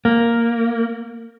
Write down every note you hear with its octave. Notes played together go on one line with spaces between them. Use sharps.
A#3